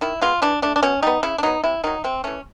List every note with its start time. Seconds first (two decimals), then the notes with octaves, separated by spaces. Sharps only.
0.01 D#3 E4
0.21 G#3 B3 F4
0.42 E3 D4
0.62 A3 D4
0.76 D4
0.83 B2 C#4
1.02 G3 B3 D#4
1.23 C#3 E4
1.38 D4
1.43 F#3 B3 D#4
1.64 C3 E4
1.84 D#3 F#3 D#4
2.04 C3 C4
2.24 E3 A3 C#4